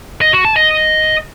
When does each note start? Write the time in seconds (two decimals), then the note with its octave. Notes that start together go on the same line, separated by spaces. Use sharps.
0.21 D#5
0.33 F#4
0.45 A5
0.56 D#5